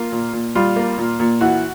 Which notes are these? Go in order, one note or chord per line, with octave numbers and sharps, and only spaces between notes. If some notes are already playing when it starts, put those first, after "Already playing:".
Already playing: A#3 F4
A#2
A#2
G3 F4
A#3
A#2
A#2
E3 F#4